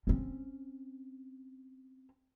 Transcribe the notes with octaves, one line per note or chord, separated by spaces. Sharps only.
C4 C#4